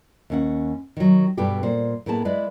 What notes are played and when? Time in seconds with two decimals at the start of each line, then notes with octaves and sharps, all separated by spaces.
0.30 D#2 C#4 F#5
0.97 D#3 F#3
1.37 G2 B2 B3 G4 A4
1.63 A#2 C5
2.06 A2 A#3 B3 G#4 A5
2.25 G#3 E4 B4 D5